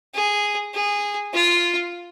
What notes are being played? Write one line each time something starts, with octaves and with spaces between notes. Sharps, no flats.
G#4
G#4
F4